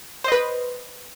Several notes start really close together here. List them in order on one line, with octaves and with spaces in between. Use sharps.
C5 D#5 B4